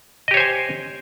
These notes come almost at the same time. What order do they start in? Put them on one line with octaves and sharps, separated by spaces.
D#5 G4 C#5 C5 G#5